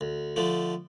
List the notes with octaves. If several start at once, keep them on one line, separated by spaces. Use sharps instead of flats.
D2
D3 F3 A3